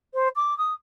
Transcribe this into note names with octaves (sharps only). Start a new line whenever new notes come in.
C5
D6
D#6